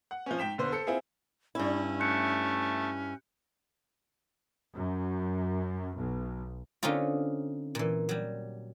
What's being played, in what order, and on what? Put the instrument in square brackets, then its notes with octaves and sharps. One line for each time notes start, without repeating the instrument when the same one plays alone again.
[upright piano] F#5
F3 C4 C#4
G#2 G5 B6 E7
F1 D3 B3 C5
A4 C5 C#7
C4 E4 F4 G#4
[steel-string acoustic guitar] G2 E4 [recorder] C#4
[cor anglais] A3 [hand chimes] F#6 G6 C#7
[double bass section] F#2
B1
[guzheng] D3 C4 C#4 D#4 F4
A#2 E3
F#3 G3